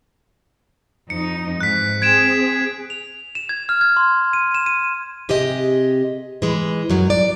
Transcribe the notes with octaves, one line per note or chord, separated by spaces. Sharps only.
F2 D#4 C#7
G#2 E3 F#6 B6
C4 G#4 G#6 D7 E7
F7
E7
G#6
F6
G#6
C6
D#7
E7
D#7
C3 G4 G#4 D#5
E3 G#3
F#2 F#3
D5